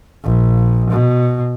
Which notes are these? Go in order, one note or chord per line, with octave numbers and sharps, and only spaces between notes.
A#1
B2